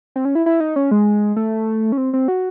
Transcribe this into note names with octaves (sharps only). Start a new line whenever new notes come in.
C4
C#4
E4
E4
D#4
C#4
G#3
A3
C#4
C4
C4
F#4